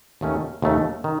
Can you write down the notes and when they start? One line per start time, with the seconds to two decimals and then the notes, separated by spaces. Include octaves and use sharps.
0.21 D#2 D#3 A3 C#4
0.62 D#2 D#3 A3 C#4
1.04 D#3